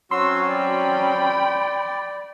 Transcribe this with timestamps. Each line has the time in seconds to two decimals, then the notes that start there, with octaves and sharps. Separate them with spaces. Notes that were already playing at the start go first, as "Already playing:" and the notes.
0.11 F#3 C4 C#4 F#4 C6 E6
0.49 D5 G5 B5